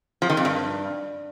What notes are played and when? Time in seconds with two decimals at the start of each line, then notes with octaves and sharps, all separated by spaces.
0.22 F3
0.30 D#3
0.37 F2
0.45 G2